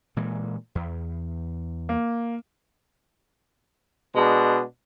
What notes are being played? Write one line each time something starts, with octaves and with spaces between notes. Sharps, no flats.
A#2 E3 G#3
E2
A#3
B2 G#3 D4